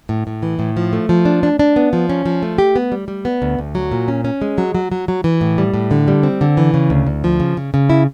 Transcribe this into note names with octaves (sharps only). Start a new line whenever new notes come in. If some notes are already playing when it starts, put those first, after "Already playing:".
A2
A2
E3
A2
F3
A3
F3
D4
D4
D4
B3
F3
C#4
F3
A3
G4
B3
G3
G3
B3
D2
D2
F#3
A#2
C#4
C#4
G#3
F#3
F#3
F#3
F#3
E3
A2
G3
A2
D3
G3
C4
D3
E3
C#3
D2
D2
F3
C#3
C#3
C#3
E4